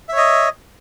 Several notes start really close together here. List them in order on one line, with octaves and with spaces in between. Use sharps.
E5 C#5 D#5